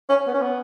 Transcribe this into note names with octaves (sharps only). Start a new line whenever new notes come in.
C#4
B3
C#4
B3